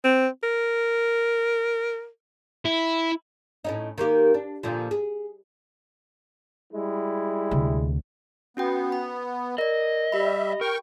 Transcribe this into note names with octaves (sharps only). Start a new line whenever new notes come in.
C4
A#4
E4
A2 C#4 D#4
D#3 A#3 G4
D4
A#2 D3 F3
G#4
G3 G#3 E4
D2 C3
B3 C#4 F#4 G5
B5
A#4 D5 D#5
G3 G4 E5 B5
A#4 G5 C#6